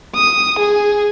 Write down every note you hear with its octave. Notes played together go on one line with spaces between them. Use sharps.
D#6
G#4